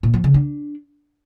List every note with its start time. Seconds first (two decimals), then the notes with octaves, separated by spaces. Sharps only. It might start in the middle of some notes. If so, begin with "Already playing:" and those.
0.03 A#2
0.14 F3
0.24 C#3
0.34 D4